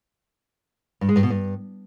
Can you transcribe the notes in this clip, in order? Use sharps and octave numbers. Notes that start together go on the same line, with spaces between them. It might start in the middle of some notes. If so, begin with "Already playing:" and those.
G2
G#3
G2
B2
G2